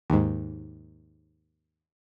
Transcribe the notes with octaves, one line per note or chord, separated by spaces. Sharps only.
D#2 G#2